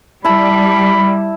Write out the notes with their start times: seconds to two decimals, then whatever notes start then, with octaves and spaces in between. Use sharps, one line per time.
0.25 G3 E4 A5 B5